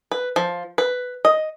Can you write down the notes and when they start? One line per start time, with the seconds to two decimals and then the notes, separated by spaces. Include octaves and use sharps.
0.12 B4
0.36 F3
0.78 B4
1.25 D#5